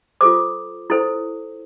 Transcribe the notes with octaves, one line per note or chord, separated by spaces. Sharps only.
F4 A4 C5 D6
E4 A4 C5